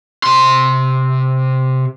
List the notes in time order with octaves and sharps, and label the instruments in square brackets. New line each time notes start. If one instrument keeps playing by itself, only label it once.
[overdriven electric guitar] C3 C6